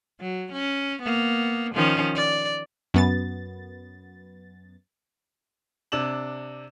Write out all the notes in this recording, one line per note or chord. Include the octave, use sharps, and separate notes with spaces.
F#3
C#4
A#3 B3
D#3 F3 C#4
D5
F#2 B3 A6
C3 D4 E7 F#7